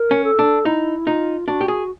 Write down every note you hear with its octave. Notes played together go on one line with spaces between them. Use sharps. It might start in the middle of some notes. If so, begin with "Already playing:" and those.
Already playing: A#4
C#4
A4
D4
D#4 E4
D#4 F4
D4 F#4
G4
G#4